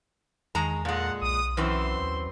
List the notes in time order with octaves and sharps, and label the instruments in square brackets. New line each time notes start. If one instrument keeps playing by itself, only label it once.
[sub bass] E2 [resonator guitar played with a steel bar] D#3 G#3 A#5
[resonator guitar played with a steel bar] A#2 G#3 [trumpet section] A4 A#4 F#5
[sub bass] B1 [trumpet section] D#6
[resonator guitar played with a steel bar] F#2 E3 C4 [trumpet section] C5 C6
[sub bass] D#2